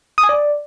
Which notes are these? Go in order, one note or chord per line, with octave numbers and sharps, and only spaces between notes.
D#6
G#5
D5